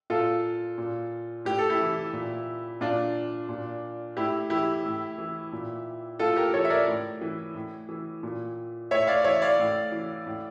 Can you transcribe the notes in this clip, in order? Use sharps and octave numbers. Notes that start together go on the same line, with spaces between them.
A#2 F4 A4
A#2
A2 G4
A4
E4 G4
E3
A#2
A#2 D4 F4
A#2
A2 E4 G4
E3 E4 G4
A2
E3
A#2
A2 F4 A4
G4 A#4
E3 A4 C#5
E5
A#4 D5
A2
E3
A2
E3
A#2
A2 C#5 E5
D5 F5
E3 C#5 E5
D5 F5
A2
E3
A2